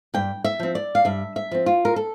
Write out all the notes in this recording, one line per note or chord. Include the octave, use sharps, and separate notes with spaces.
G2 G5
E5
F3 C4
D5
F5
G2 E5
E5
F3 C4
F4
A#4
A4